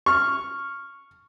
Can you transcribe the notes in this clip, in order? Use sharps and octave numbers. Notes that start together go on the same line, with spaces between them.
C#6 F6